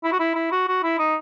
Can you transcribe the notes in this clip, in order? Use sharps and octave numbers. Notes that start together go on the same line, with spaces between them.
E4
F#4
E4
E4
F#4
F#4
E4
D#4